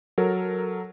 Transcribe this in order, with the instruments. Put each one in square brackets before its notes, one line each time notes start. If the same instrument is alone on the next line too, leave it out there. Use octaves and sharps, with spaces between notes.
[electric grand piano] F#3 A4 A#4